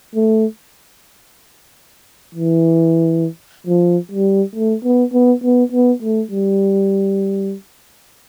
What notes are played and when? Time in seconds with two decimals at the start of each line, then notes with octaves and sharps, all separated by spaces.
0.15 A3
2.35 E3
3.67 F3
4.11 G3
4.55 A3
4.84 B3
5.13 B3
5.43 B3
5.72 B3
6.02 A3
6.31 G3